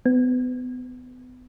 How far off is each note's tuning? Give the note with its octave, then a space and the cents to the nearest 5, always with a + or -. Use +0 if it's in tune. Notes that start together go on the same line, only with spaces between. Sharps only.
B3 +30